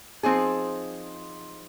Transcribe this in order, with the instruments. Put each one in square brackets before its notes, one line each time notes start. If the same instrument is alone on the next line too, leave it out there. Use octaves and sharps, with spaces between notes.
[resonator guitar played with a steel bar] F3 C4 D#4 G#4